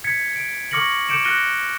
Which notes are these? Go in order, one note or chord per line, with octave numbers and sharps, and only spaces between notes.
G#6 B6 C#7
D7
C#6 D6 F6 A#6 C#7 F#7
D6 G6 C#7 D7 E7
F6 F#6 A#6 C#7 D#7 G7